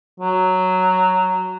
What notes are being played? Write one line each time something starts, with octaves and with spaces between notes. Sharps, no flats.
F#3